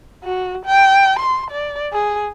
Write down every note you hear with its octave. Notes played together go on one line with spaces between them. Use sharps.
F#4
G5
C6
D5
G#4